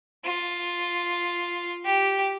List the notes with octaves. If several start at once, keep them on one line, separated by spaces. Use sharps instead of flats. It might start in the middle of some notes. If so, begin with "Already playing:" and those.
F4
G4